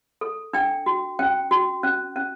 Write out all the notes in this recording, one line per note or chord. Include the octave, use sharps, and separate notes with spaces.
A4
D4 G5
F#4
C#4 G5
F#4
C#4
C#4